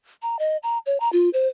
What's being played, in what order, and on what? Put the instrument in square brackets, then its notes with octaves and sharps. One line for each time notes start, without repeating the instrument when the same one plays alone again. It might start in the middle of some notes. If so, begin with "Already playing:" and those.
[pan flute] A#5
D#5
A#5
C#5
A#5
F4
C5